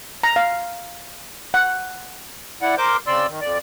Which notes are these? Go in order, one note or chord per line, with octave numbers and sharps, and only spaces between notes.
A#5
F5
F#5
E4 D5 F#5
A#4 C5 D6 G6
C#3 C4 D5 C6 E6
D#3
F2 D5